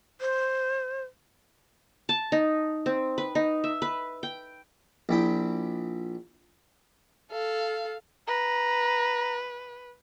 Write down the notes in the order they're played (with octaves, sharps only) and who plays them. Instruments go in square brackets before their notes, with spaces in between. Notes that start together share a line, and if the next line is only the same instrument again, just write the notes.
[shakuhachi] C5
[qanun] A5
D#4
C4
B4
D#4
E5
B4
G5
[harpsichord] A#1 E4 G5
[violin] A4 F5
[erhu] B4 [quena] A#5